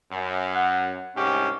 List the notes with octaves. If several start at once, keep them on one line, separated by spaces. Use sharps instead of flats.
F#2
F#5
C2 G#2 C#4 G4